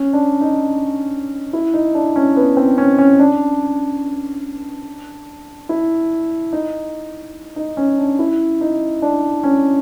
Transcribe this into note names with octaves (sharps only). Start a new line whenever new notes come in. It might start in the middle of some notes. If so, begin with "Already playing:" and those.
Already playing: C#4
D4
D#4
E4
D#4
D4
C#4
B3
C4
C#4
C#4
D4
E4
D#4
D#4
C#4
D4
E4
D#4
D4
C#4